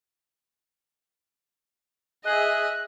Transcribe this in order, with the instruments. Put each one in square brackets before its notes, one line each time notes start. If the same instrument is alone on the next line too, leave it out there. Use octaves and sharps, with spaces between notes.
[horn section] G#4 [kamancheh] D#5 E5 [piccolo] F#6